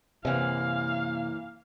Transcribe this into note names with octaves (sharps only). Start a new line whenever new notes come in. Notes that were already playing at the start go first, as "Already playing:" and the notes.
F#2 C3 E3 A#3 F5